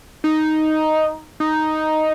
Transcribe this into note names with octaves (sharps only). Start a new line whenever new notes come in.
D#4
D#4